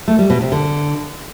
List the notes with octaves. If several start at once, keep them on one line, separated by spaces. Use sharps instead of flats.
A3
G3
B2
C3
D3